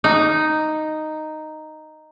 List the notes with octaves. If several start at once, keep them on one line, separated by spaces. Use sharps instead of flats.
D#4